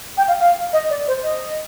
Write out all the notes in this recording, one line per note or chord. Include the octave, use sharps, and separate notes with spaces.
G5
F5
F5
D#5
D5
C5
D#5